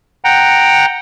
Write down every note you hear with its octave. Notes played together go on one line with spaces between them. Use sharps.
F#5 G5 A#5